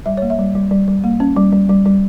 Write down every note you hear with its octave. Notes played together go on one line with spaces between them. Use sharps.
G3 E5
A#3 C#5
E5
G3
G3
G3
G3
A#3
C#4
G3
G3
G3
G3